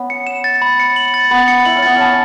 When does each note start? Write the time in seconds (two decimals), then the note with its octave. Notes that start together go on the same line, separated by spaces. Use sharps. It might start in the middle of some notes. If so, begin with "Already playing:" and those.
Already playing: B3 C#4
0.10 C#7
0.27 E7
0.44 A6
0.62 B5
0.79 C#7
0.96 F#7
1.14 A6
1.31 B3 B5
1.48 C#7
1.65 E4 F#7
1.76 C#4
1.83 B3 A6
1.96 C#4 A5